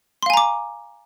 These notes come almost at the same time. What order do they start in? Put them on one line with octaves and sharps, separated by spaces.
C6 F5 G#5 A#5 D6